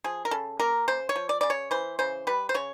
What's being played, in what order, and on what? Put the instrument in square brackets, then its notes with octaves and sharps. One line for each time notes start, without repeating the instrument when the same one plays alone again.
[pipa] F3 G#4
A#4
C#3 A4
A#3 A#4
C#3 C5
C#5
F3
D5
C#3 D5
C#5
E3 C5
C#3 C5
G3 B4
C5
C#3 C#5